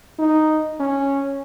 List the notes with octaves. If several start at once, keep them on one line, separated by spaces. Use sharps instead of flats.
D#4
C#4